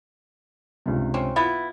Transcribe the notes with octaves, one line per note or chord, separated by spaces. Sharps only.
C#2 G2 C3
C4 C#4
B3 E4 F4 A6